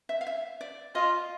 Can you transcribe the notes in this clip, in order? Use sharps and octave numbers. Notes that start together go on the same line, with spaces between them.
E5
F5
E5
D5
F4 D#5